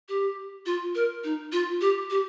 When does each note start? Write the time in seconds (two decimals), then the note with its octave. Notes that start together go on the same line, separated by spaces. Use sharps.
0.09 G4
0.66 F4
0.95 A#4
1.24 D#4
1.52 F4
1.81 G4
2.10 G4